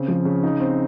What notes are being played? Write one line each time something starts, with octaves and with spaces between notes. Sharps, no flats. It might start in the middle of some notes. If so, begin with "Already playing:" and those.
Already playing: C#3 C4
F3
C#3
D#4
C4